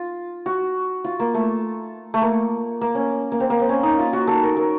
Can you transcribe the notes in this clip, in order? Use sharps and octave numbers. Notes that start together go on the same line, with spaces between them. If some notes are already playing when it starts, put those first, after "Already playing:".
Already playing: F4
F#4
F4
A#3
A3
A3
A#3
A#3
C#4
A#3
C4
A#3
C4
C#4
D#4
F4
F#4
A4
A#4
A#4